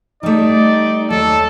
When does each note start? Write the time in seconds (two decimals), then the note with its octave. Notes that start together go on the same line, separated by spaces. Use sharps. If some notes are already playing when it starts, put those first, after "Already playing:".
0.23 G3 A3 D#4 D5
1.10 D#2 F#3 A4